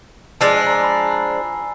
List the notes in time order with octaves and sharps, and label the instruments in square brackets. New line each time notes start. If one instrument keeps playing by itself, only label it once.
[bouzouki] F3 G#3 D4 [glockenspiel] A5 E6 C7
[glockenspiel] G#5 A#5
B5